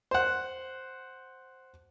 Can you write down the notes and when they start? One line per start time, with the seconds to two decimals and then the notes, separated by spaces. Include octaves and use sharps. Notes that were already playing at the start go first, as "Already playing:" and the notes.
0.11 C5 F#5